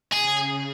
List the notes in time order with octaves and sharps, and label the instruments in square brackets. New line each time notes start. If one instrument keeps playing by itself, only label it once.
[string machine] C#3 [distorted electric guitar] G#4